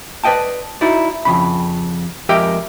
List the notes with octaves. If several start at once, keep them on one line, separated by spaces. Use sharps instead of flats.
B4 D5 D#5 G5 A5
D#4 E4 F#4 D5
F2 C#3 B5
F2 G#3 G4 A#4 E5 G5